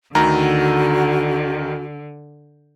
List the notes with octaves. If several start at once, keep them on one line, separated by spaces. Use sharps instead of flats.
D2 D3 D#3 F#4 A#5